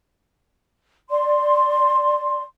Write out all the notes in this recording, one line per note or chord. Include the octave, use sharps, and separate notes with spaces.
D5 C6